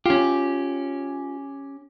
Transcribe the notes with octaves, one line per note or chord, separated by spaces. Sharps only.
C#4 F4 G4